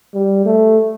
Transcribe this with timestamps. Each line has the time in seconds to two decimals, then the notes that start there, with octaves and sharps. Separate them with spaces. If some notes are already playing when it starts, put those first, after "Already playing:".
0.14 G3
0.45 A3